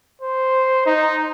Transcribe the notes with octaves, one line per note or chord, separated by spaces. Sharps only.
C5
D#4